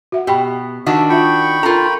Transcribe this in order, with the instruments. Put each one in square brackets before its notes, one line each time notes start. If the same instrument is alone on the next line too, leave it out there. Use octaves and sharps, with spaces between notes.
[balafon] F#4 E5 F#5
[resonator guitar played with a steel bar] B2 [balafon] G4 G5 B5
[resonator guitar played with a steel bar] D#3 D4 F#4 [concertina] E5
[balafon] F4 E5 [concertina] G5 B5 C#6
[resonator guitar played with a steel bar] F4 A#5 [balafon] A4 A#4